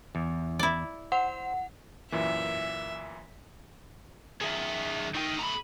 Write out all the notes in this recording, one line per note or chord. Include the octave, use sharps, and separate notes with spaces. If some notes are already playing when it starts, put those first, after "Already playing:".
E2
E4 D5
C5 F#5
F#2 A#2 E3 E5
F#2 D#3 G#4 E5
A3 D#4 D#5 G5
A#5 B5